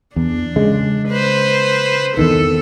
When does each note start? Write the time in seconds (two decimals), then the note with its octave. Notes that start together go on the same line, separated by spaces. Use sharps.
0.16 E2 D4
0.56 C#3 G#3
1.08 B4 C5
2.17 E2 D#3 E3 C4 A4